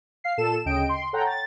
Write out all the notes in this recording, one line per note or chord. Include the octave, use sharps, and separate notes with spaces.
F5 C7
A#2 A4 E7
D2 C#3 D#5 G5 D7
C6
A4 C#5 F#5 G5 A#5
A6